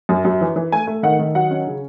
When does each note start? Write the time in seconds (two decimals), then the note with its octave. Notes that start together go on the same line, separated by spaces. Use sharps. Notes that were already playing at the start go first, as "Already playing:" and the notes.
0.09 F#2
0.25 F#2
0.41 E3
0.56 E3
0.72 A3 G#5
0.87 A3
1.03 D#3 F#5
1.19 D#3
1.35 F#3 F#5
1.51 C#4
1.67 C#3